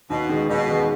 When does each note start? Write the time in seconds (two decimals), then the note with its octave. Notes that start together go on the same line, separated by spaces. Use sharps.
0.10 D#2 B2
0.29 D#3 G#3
0.49 D#2 B2
0.69 D#3 G#3